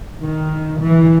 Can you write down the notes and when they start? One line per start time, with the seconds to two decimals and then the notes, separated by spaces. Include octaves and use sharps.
0.22 D#3
0.83 E3